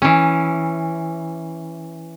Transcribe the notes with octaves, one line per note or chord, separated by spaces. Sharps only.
E3 C#4